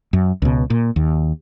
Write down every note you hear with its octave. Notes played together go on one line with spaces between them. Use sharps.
F#2
C#2 B2
A#2
D#2